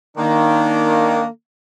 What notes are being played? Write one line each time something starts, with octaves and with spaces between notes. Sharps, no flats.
D#3 A#3 D4